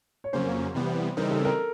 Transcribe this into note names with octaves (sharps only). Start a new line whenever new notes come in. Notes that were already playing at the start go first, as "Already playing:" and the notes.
C#5
F2 C#3 F#3 A#3 C#4 C5
C3 E3 G3 B3
C#3 E3 G3 C4 D#4 A#4
A4
A#4